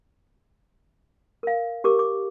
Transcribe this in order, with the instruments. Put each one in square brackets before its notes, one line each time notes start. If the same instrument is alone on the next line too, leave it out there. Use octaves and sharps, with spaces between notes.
[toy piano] A#4 F5
G4 A#4 D6
D6